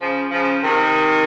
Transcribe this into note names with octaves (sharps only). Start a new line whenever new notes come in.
C#3 F3
C#3 F3
C3 D#3